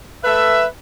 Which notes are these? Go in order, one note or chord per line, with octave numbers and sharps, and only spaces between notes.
A3 B4 E5